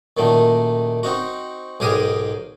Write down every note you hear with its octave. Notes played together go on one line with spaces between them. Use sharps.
F#2 A#2 D#3 A3
C4 D#4 F#4
B1 G#2 G4 G#4 A#4 D#6